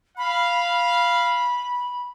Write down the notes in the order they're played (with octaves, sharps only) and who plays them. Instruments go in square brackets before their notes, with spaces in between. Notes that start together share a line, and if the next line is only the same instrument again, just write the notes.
[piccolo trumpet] F5 [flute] B5